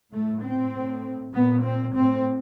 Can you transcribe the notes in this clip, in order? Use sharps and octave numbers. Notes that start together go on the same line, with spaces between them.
A2 A3
C4
A2
A#2 B3
C4
A2 C4